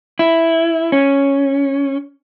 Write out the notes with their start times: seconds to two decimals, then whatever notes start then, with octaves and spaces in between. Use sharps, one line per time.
0.19 E4
0.92 C#4